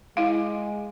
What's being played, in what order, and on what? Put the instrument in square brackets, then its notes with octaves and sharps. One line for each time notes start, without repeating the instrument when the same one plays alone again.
[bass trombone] G#3 [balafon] E4 F5